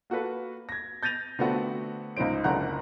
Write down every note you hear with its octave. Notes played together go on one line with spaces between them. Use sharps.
A#3 F#4 A4 B4
G#6 A#6
G6 A6 A#6 D#7 F7
D3 A3 B3 C4 F#4
C#2 G#2 D#4 C5 D7
F#1 C#2 D3 F#5 A#5 F#6